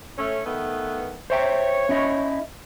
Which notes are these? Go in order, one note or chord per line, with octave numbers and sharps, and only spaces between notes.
A3 C#4
D#3 A3 B3
C5 C#5 E5 G5
C#4 E4 D#5